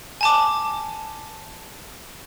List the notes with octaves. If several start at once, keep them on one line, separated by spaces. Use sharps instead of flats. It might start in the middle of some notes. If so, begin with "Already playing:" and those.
G#5 A5 D6